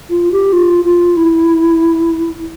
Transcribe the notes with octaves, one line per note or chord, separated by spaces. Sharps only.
F4
G4
F4
F4
E4